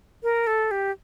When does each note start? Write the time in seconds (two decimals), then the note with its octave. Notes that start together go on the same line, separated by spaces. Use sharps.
0.23 A#4
0.47 A4
0.71 G4